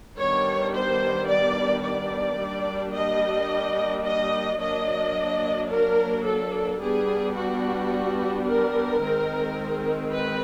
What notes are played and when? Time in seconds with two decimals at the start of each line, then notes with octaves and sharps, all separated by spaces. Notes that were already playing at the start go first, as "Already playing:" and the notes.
0.18 D#3 G3 B3 D4 C#5
0.74 C5
1.29 D5
1.83 D5
2.38 G3 A#3 D4
2.94 D#5
4.05 D#5
4.60 F#3 A#3 D4 D#5
5.70 A#4
6.26 A4
6.80 G3 B3 D4 G#4
7.36 F#4
8.47 A#4
9.02 D#3 G#3 C4
10.12 B4